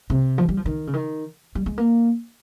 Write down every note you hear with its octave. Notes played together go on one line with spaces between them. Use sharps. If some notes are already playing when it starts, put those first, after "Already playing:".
C3
F3
G3
F3
D#3
C#3
D#3
G3
G#3
A#3